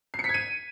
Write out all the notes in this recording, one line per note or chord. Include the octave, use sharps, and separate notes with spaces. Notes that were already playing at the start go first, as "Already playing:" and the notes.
C7
C#7
B6
G#6
D#7